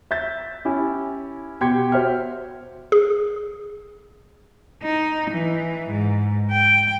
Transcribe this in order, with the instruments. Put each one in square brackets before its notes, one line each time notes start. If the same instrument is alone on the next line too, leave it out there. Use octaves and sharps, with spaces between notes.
[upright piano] E5 G6 A6
C#4 E4 G4
B2 G4 G5 C6 G#6 C#7
F#4 C5 E5 F6
[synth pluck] G#4
[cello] D#4
E3
G#2
G5